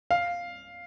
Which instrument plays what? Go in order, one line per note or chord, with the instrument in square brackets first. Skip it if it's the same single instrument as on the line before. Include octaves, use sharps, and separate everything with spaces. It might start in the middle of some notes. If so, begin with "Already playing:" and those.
[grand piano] F5